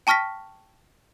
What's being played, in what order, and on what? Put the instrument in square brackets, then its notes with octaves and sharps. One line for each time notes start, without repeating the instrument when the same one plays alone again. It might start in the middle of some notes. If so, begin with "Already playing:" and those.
[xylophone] G5 A5 C#6 F6 A#6 B6